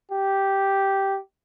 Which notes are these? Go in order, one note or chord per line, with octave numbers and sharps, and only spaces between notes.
G4